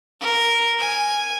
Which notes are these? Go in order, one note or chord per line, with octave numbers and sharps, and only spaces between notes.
A#4
G#5